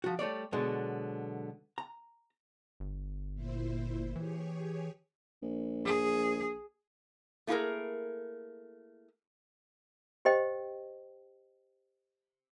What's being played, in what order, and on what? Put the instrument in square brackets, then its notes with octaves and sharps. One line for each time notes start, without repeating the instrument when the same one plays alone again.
[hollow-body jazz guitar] F3 F#4
G3 A3 C#5 D5
B2 D3 F#3 G#3 B3
A#5
[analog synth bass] G1
[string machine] A#2 E4 C5
[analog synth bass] E3 [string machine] G4 G#4 C#5
[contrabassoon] A#1
[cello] G#4
[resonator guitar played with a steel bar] A3 A#3 E4 G4 G#4 A#4
[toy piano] G4 C5 D#5 G5